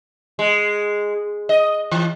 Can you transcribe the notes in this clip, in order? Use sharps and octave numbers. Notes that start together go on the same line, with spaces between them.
G#3
D#5
E3